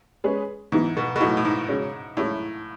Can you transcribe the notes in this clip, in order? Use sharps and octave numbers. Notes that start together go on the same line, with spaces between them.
G#3 C#4 G#4 B4
G#2 E3 B3 E4
B2
B2
A2 F#3 A3 D#4 F#4
A2
G#2
C#3 G#3 C#4 F#4
A2 G#3 C#4 E4